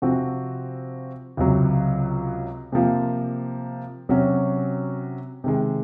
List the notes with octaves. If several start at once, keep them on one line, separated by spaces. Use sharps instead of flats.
C3 F3 C4 F#4
C#2 C3 F#3
C3 F3 A#3 F4
C3 F#3 C#4 F#4
C3 D#3 G#3